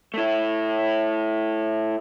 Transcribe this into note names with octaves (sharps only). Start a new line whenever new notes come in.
A3 E4